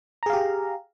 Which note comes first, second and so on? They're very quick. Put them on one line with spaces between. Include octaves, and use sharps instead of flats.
A#5 G#4 F5 G4